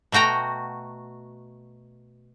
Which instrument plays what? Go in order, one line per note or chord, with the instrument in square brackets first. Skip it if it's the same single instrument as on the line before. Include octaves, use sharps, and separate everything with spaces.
[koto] B2 A3 F#4 G5 A#5